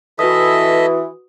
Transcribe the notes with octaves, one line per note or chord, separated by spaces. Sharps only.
E3 F#4 A4 B4 D#5 E5 D#6